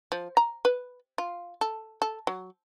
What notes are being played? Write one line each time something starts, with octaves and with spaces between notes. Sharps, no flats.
F3
A#5
B4
F4
A4
A4
F#3